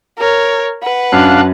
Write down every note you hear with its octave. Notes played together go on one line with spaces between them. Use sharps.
A#4 C#5
B4 F#5
F#2 D4 F5 F#6